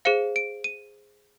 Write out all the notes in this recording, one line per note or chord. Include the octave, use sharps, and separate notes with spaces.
G#4 C5 F5 C#7
D7
D#7